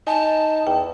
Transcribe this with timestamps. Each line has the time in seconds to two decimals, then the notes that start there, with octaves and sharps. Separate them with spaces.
0.07 D#4 G#5 A5
0.67 E2 G5